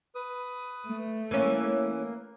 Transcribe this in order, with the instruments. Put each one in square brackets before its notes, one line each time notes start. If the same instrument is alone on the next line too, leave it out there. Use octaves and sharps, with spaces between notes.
[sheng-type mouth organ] B4 D#6
[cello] A3
[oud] E3 C#4 [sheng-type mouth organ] A#3